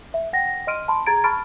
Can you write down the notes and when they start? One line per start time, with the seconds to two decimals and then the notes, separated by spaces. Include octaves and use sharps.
0.14 E5
0.33 F#5 G5 A#6
0.67 D#5 C6 F6 D7 D#7
0.88 A5 B5 C6
1.06 G#4 A#5 G#6 A6 D7
1.24 A5 B5 C#6 F6 A6 D7